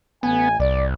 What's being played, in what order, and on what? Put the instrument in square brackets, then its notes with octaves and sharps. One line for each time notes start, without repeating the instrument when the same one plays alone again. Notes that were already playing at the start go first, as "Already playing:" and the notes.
[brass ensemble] A1 G#5 [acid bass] B3
[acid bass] C2 [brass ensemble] D5